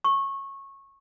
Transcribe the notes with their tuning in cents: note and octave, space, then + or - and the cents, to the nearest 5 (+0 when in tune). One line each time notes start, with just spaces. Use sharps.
C#6 -20